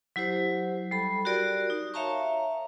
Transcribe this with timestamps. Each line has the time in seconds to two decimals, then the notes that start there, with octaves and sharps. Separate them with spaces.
0.16 F#3 E4 G4 C5
0.91 G3 A4 B5
1.25 F#4 G4 A#4 D5
1.70 D#4
1.94 C#5 E5 F5 A5 A#5 C#6